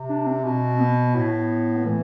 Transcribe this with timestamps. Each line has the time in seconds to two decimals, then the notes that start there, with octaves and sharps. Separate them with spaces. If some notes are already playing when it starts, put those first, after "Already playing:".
Already playing: C3
0.09 D4
0.26 C4
0.44 B2
0.80 B3
1.16 A2
1.76 B3
1.85 E3 A3